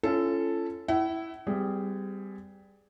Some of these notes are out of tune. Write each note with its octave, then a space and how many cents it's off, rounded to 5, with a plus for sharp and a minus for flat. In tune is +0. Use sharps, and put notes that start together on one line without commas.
C#4 +0 F4 -35 A4 +0
E4 +0 F#5 +45
G3 +0 C4 -40 G#4 +0